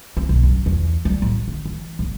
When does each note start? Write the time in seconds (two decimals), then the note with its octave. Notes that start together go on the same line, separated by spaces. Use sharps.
0.17 C4
0.29 B1
0.43 F#2
0.66 E2
1.05 G3
1.22 A1
1.48 D3
1.66 E3
1.99 G1